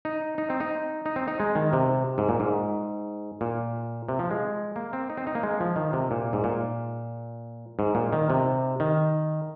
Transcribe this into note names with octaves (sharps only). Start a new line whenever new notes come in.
D#4
D#4
C4
D#4
D#4
C4
D#4
G#3
D#3
C3
G#2
A#2
G#2
A#2
C3
F3
G#3
A#3
C4
D#4
C4
D#4
A#3
G#3
F3
D#3
C3
A#2
G#2
A#2
G#2
A#2
D#3
C3
D#3